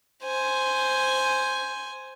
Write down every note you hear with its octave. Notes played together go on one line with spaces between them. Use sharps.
C5 G#5